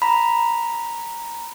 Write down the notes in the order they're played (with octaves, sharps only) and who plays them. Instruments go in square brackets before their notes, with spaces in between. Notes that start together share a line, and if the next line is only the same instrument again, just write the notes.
[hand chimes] A#5 B5